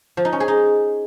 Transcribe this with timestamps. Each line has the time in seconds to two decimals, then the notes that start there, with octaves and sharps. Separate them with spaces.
0.17 F3
0.25 D#4
0.33 C#4
0.40 G#4
0.48 D#4